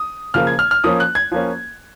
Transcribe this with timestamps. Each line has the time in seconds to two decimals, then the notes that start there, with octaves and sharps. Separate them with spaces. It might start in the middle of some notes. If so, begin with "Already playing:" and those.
Already playing: D#6
0.34 C#3 F3 A#3 F6
0.47 G#6
0.59 F6
0.71 F6
0.84 F3 A#3 C#4 D#6
1.00 F#6
1.15 G#6
1.32 F3 A#3 C#4